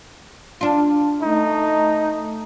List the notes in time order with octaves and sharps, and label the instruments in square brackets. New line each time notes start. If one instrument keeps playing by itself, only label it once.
[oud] D4 F4
[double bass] A3 [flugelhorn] D#4